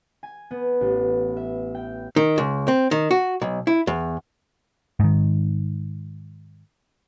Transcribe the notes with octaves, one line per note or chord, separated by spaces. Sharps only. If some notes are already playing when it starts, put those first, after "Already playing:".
G#5
B3
A1
E5
G5
D#3
C#2
C4
D#3
F#4
B1
E4
E2
G#2 D#3